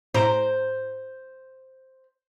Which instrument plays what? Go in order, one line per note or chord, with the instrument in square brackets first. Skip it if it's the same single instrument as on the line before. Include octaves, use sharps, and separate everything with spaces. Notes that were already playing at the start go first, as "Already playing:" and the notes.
[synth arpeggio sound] A2 A#5 D7 [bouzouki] C5